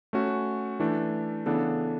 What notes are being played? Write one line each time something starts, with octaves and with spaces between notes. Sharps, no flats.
A3 C#4 F#4
E3 A3 D4
C#3 E3 B3 D4 A4